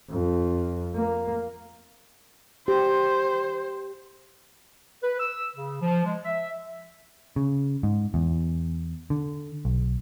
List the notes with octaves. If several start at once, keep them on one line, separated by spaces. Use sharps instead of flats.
F2
A#3
G4 C5
B4
E6
C#3
F3
G#3
E5
C#3
G#2
E2
D3
B1